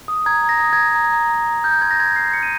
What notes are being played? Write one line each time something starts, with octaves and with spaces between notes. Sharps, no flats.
D#6
A#5 G#6
A#5
A#6
D#6
A#5 G#6
A#5
A#5
A#5
A#5
F6 G6
C6 G#6
A#6
C6 G#6
F6 C7
F6 C#7
D#7